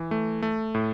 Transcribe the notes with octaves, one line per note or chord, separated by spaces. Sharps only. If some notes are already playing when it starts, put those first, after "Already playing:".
Already playing: E3
A3
A3
A2